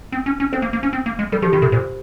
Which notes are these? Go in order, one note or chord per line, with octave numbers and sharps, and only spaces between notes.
C4
C#4
C#4
C4 C5
A#3
A#3
C#4
C4
A#3
G#3
G3 A#4
F3 G4
D#3 F4
C3 A#4
A#2 C5